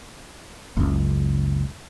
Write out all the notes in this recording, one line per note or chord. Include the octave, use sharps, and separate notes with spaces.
F#1 C#2